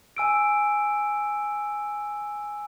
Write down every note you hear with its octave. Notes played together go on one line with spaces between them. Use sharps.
G#5 E6 D7